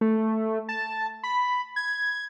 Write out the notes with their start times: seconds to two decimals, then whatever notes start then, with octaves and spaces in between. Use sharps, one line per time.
0.01 A3
0.69 A5
1.23 B5
1.76 G#6